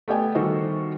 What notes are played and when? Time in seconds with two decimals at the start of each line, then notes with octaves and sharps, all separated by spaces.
0.08 A3 B3 G4 D5 G5 G#5
0.35 D#3 G3 F#4 A4 C5 D#5